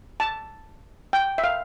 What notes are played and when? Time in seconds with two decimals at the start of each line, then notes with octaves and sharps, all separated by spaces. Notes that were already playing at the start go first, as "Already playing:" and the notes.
0.20 A5
1.13 G5
1.38 E5
1.44 F5